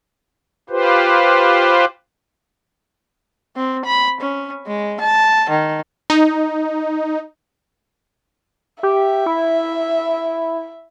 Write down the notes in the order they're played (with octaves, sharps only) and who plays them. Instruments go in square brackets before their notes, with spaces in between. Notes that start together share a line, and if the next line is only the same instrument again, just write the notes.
[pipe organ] F4 G4 B4 C5
[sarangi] C4
B5
C#4
G#3
A5
D#3
[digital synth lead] D#4
[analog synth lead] G4 [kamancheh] E5
[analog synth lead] E4